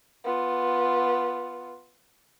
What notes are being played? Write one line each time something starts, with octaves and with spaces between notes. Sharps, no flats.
B3 F4